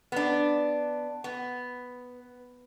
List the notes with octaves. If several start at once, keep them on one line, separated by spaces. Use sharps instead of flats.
B3 D4
B3